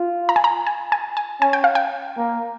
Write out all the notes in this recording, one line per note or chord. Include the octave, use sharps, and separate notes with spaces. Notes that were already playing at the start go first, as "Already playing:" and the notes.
Already playing: F4
A#5
G#5
A#5
G#5
G#5
G#5
C#4 G#5
G5
F5
G5
A#3